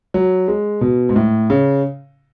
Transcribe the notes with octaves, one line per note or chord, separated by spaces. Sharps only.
F#3
G#3
B2
G#2
A2
C#3